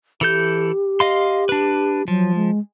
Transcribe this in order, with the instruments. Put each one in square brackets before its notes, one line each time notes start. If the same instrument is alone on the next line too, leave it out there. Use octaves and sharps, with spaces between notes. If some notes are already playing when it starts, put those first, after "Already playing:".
[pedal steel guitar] E3 A4 G6 [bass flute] G4
[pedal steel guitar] D#5 F5 C6
D4 B4
[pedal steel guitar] F3 [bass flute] F#3
[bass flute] G#3